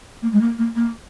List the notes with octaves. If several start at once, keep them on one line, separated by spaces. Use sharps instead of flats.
A#3
G#3
A#3
A#3
A#3